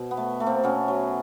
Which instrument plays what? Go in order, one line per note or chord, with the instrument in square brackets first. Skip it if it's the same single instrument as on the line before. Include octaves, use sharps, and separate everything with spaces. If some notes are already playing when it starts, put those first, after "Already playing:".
Already playing: [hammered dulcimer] B2
B3
A3
A3
A#3 C4
B2 B3 C#4
F#3